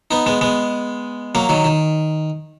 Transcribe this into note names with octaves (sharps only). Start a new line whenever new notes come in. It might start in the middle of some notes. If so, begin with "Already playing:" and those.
B3 D#4
G#3 B3
G#3 B3
F#3 A#3
D#3 F#3
D#3